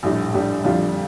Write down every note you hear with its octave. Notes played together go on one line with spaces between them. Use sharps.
A#1 A2 G3 D4
A#1 A2 G3 D4
F2 D3 G3 D4 F4